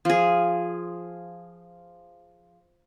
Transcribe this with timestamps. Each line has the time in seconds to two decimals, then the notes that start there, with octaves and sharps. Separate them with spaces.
0.05 F3 G#4